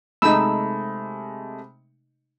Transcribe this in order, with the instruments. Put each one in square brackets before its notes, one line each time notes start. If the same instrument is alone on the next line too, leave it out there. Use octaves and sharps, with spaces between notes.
[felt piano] C3 G#3 A3 [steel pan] D#4 E6 [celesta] B5